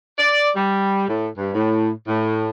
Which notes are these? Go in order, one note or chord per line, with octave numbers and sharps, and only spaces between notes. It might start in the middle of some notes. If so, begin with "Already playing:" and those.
D5
G3
A2
G2
A2
A2